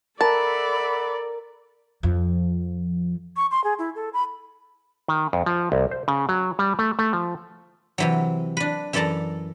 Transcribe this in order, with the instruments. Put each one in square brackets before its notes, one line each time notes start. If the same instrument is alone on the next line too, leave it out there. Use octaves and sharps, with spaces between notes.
[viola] A4 D5 [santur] A#4 [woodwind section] E5 F#5 B5 [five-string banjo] A5
[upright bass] F2 F3
[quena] C#6
C6
G#4
E4
A4
B5
[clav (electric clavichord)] D#3
F2
F3
C2
C5
C#3
F#3
G3
A3
A3
F3
[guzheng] C3 E3 F#3
D4 B4
F#2 E3 A4 D5 A5 A#5